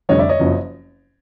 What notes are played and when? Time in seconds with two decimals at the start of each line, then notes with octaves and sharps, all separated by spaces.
0.09 F1 F2 D3 G3 C#5 D#5
0.19 D5 E5
0.29 C#5 D#5
0.39 F#1 F#2 C#3 F3